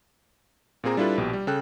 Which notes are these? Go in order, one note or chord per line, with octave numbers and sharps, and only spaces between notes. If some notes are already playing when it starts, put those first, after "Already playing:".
A#2 A#3 C4 G#4 A#5
G3 D4 E4 F4 A4 B4
A#1 B2 G4
G3
C#3 A4 G5 F#6